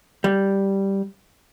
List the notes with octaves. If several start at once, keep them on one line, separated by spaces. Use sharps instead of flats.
G3